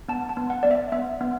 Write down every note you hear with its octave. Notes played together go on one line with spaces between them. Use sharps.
B3 A5
A5
B3
F#5
B3 D5
E5
B3 E5
B3